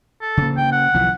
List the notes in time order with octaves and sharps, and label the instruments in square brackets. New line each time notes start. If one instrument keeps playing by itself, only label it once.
[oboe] A4
[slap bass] C#3 A#3
[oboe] G5
F#5
[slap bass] B1 E3 F3